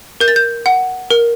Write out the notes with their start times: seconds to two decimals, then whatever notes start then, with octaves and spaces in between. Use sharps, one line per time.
0.20 A#4 G6
0.28 A6
0.36 G6
0.66 F#5
1.10 A#4